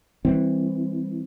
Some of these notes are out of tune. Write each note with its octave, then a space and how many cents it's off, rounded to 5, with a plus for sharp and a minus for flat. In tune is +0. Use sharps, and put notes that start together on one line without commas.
E3 -10 G3 +25 C4 +0